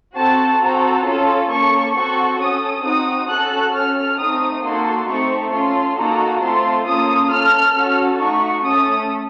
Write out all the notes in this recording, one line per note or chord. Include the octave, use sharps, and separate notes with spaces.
C4 F#4 A4 A5
C4 F#4 A4 A#5
C#4 F4 A4
A#3 C#4 A4 C#6
C4 F#4 A4 C#6
C#4 A4 D#6
C4 D#4 F#4 D#6
C#4 F#4 A4 F#6
C#4 A4 F6
A3 C4 D#4 D#6
A#3 D#4 F#4 A4 C6
A3 C4 D#4 A4 C#6
C#4 F4 A4 C6
A#3 D#4 F#4 A4 A#5
A3 C4 F4 A4 C6
A#3 C#4 F4 A4 D#6
C#4 A4 F6
C#4 F#4 A4
A3 D#4 F#4 C#6
A3 C#4 A4 D#6